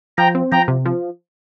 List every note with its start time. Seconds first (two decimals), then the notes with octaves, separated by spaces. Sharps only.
0.18 F3 G5 A#5
0.35 C4
0.52 F3 G5 A#5
0.68 C3
0.86 F3